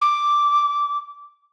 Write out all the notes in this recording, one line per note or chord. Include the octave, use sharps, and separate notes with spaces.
D6